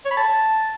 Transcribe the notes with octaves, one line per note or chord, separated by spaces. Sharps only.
C#5
B5
A5